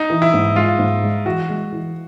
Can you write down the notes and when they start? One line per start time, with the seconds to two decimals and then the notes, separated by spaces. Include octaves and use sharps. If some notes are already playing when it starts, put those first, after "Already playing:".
Already playing: D#4
0.10 E3
0.22 E4
0.34 G#2
0.56 G#3 F4
0.79 G#2
1.03 G#3
1.26 E3 F#4
1.49 G#3
1.72 E3